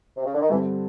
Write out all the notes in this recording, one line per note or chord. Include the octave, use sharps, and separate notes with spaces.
C3
C#3
D3
D#3
G2 D3 E3 G3 C4